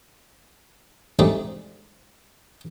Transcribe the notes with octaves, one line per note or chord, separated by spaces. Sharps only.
G#2 G3 A3 C4 D4 G#4